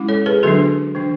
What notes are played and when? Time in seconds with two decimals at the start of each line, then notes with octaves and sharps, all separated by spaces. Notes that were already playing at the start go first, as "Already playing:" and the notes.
Already playing: G#3 C#4 E4
0.08 A4 C#5
0.26 G#4 B4
0.43 D3 F#3 B3 D4 F#4 A4
0.95 E3 A3 D4